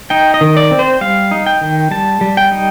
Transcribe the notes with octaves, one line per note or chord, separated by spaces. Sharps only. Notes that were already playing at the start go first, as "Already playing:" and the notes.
D#4 G5
D#5
D#3
D5
C4
C5
G3 F5
D#4
G5
D#3
G3 A5
G3
G5
D#4